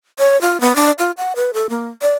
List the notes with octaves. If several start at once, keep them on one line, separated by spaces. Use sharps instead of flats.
C#5
F4
B3
D4
F4
F#5
B4
A4
A#3
D5